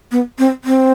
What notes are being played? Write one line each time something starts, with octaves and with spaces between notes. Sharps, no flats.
B3
C4
C4